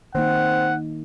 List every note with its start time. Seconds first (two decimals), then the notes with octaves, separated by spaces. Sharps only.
0.15 D#3 A#3 C4 D#4 F#5